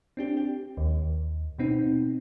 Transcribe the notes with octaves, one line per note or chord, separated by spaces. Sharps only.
C4 D4 G4
G4
D#2
B2 B3 C4 D#4